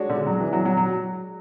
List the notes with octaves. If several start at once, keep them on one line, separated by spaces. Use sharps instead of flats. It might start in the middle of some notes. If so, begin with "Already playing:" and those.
Already playing: G#3 D4 F#4 C#5
D3
F#3
E3
F#3
F#3
F#3